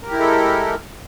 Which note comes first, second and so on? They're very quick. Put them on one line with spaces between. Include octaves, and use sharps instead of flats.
A#4 G4 E4 G#3 A4